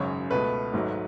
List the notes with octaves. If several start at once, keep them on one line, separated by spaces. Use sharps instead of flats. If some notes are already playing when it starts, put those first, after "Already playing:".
Already playing: G#1 F#2 C#3 C#5
C#2 B2 A3 B4
G#1 G#2 F#3 A3